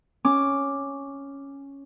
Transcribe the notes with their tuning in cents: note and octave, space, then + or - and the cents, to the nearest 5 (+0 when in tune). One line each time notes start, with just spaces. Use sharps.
C#4 +0 D6 +0